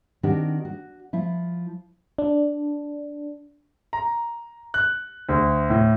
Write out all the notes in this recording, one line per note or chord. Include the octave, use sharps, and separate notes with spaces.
D#3 C4 D4 F#4 G4
F#4
F3 E4 F4
D4
A#5
F#6
D2
A2